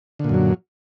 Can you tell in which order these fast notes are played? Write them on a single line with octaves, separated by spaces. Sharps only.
D3 A#2 F#2 F#3